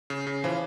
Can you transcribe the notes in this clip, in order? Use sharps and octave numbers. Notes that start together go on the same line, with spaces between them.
C#3
C#3
C#3 E3 F3